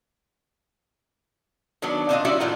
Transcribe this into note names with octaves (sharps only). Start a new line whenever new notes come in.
D#3 F#3 B3 D4
A#2 C4 D4 D#4 D#5 F5
G3 C#4 E4 F#4 D5 E5
A2 D#3 F4 F#5 A#5